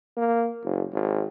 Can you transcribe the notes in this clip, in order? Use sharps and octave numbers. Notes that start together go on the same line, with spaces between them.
A#3
F#1
G#1